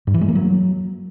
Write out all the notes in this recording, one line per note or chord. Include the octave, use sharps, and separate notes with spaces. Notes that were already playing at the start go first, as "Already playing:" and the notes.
G2
E3
G#3
A#3
F#3